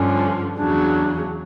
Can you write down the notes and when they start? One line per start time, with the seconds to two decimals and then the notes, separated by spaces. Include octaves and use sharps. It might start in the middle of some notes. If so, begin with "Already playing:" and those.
Already playing: G2 D3 F3 C#4
0.59 E2 C#3 F#3 D4